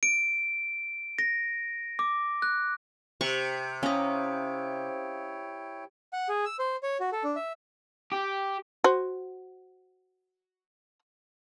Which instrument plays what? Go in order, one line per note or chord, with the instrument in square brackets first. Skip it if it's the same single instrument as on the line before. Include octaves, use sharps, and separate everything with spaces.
[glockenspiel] D7
A#6
D6
F#6
[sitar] C3 [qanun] C#6
[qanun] C#4 A#5 [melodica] E4 C#5 G5 [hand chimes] F5 D#6
[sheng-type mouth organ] F#5
G#4
E6
C5
C#5
F#4
A4
D4
E5
[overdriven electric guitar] G4
[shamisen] F#4 C5